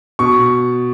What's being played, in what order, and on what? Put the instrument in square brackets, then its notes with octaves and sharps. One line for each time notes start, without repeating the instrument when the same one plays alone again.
[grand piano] B2 C#6